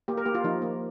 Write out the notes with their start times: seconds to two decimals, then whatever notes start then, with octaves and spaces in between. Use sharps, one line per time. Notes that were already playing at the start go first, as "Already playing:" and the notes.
0.08 A#3 G4
0.18 A#4
0.26 A#3 G4
0.35 F4
0.44 F3 D#4
0.62 A#3